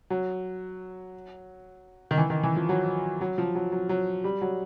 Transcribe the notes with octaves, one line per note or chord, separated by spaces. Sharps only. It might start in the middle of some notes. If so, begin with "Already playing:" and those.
F#3
D#3
E3
D#3
E3
F3
F#3
F#3
F3
F#3
F#3
F#3
G3
F#3